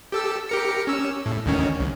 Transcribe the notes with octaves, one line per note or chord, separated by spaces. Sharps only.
G4 A4 E6
G4 A#4 C#7
C#4 E6
A2
D2 D#3 C#4
C2